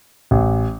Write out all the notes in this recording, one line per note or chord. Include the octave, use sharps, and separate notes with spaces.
A1